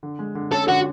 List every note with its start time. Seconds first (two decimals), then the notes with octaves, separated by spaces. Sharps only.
0.03 D3
0.19 G#3
0.35 D3
0.52 C#4 A4
0.68 D3 F#4